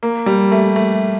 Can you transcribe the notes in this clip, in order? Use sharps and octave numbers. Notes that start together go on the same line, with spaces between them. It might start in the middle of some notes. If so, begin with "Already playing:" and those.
A#3
G3
A3
A3